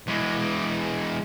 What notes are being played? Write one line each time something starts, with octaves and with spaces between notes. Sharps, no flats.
E2 G#3